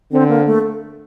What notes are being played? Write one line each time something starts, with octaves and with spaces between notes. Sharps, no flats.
D3 C4
A#3
A3